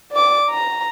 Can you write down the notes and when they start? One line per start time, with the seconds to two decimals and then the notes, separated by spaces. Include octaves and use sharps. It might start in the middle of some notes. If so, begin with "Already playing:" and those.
0.12 D5 D6
0.51 A#5